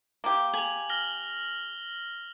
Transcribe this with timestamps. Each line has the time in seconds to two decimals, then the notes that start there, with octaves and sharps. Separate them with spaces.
0.24 A#3 G4
0.53 G#5 F7 F#7
0.89 F6 A#6 G7